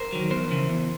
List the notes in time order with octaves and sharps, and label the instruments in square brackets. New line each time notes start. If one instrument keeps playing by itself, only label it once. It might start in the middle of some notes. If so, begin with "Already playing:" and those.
Already playing: [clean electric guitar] A#4 C5
D#3 F#3
E2 A#4 C5
C#3 E3
E2